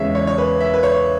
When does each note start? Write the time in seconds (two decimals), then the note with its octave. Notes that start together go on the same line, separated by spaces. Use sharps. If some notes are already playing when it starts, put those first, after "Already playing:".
Already playing: E2 C#3 G#3 C#5 E5
0.15 C#5
0.27 C#5
0.38 B4
0.60 E5
0.74 B4
0.83 C#5